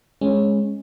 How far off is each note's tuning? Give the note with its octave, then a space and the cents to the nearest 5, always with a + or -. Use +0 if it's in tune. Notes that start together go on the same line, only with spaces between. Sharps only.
G#3 +0 C#4 -15